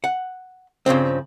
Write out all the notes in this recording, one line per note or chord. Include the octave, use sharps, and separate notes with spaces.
F#5
G2 C#3 F3 C4